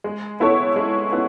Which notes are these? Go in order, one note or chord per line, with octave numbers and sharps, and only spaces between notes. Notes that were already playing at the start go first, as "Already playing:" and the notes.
G#3
B3 E4 A4 C#5
G#3
B3 E4